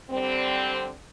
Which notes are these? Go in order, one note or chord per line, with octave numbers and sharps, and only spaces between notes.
D3 G3 C4